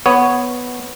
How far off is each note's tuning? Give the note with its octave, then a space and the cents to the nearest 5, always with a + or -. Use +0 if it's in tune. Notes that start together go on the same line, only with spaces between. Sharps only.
B3 +0 C#5 +0